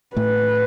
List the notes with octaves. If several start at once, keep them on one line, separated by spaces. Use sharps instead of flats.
A2 A3 B4